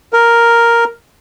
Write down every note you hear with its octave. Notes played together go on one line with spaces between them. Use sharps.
A#4